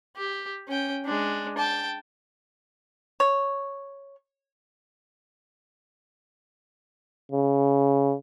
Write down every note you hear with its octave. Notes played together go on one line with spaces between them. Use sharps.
G4
C#4 G5
G#3 D4
G5 A5
C#5
C#3